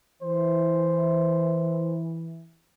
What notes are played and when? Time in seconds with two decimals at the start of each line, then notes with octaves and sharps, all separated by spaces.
0.22 E3 C5